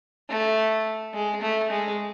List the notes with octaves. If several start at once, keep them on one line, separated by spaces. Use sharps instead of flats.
A3
G#3
A3
G#3